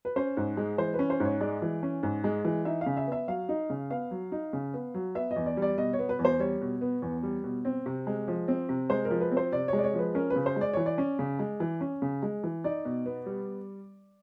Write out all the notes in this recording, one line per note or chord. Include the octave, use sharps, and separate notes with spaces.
B4
C#4 C5
G#2
G#3
E3 C5
C#4 B4
C5
G#2 C#5
G#3 D5
E3
C#4
G#2
G#3
E3
D#4 E5
C#3 F5
E5
B3 E5
F#3 F5
D#4
C#3
B3 F5
F#3
D#4
C#3
B3
F#3
B3 E5
D#5
E2
D5
G3
D5
B2 D#5
C#5
B3
B4
E2
C5
G3 C#5
B2
B3
E2
G3
B2
C4
C3
G#3
F3
C4
C3
G#3 C5
A#4
F3
B4
C4
C5
C3 D5
G#3 C#5
D5
C#5
F3 B4
C#4 A#4
B4
C#3
C5
G#3
D5
E3 C#5
D5
C#4
C#3
G#3
E3
C#4
C#3
G#3
E3
D#4 D5
B2
B3
G3